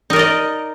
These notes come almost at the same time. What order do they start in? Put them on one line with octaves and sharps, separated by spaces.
D#4 A#4 D5 D#5